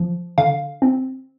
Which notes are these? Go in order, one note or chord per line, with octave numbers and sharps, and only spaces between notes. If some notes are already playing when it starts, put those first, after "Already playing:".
Already playing: F3
D3 F5
C4